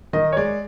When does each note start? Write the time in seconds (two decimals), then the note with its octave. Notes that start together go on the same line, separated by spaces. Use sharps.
0.13 D#3 D#5
0.33 C#5
0.37 G#3 D5